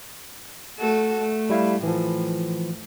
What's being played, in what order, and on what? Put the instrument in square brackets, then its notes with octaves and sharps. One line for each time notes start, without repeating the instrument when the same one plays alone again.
[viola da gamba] A3 F#4 A4
A3
[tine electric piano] G3 E4 F5
[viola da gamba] A2 [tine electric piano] E3 F3